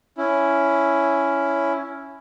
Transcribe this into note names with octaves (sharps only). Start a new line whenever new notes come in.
C#4 E4